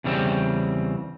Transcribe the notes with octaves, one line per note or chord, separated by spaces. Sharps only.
E2 C#3 G3 C4